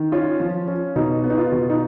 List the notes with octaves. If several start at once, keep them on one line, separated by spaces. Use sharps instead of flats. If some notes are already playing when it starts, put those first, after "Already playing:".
Already playing: D#3
C#4 F4
F3
C#4
B2 D#4
B3
D#4
F4
B2
D#4